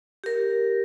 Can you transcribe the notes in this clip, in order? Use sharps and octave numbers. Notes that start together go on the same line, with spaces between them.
G4 A#4